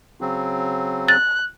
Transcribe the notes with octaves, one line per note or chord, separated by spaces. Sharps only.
C#3 F#3 C4
F#6 A6